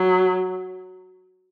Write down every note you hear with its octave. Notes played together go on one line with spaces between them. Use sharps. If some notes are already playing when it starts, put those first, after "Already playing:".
Already playing: F#3